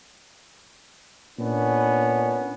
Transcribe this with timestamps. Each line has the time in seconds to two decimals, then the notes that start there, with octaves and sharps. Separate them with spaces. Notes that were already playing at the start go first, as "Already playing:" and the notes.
1.38 A#2 B3 C#4 D4